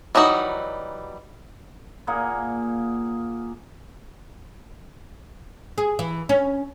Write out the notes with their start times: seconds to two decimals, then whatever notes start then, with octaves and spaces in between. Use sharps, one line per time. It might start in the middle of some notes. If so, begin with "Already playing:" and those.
0.15 E3 F#3 G3 D#4 F#4
2.07 A#2 A#3 G#4 F#5
5.78 G#4
5.99 E3
6.29 C#4